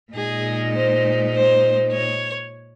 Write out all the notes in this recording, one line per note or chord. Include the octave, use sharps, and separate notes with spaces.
A#2 G#3 D#4 G#4
C5
C5
C#5